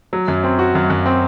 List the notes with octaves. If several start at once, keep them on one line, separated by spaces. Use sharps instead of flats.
F#3
F#2
C4
F#4
F#2
F#2
C4